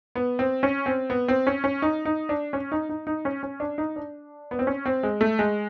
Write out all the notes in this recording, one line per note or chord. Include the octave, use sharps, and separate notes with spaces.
B3
C4
C#4
C4
B3
C4
C#4
C#4
D#4
D#4
D4
C#4
D#4
D#4
D#4
C#4
C#4
D4
D#4
D4
B3
C4
C#4
C4
G#3
A3
G#3